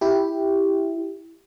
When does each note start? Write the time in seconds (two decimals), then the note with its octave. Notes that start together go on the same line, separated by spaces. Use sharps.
0.01 E4 G4